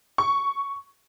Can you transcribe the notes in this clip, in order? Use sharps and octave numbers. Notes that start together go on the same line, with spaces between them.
C#6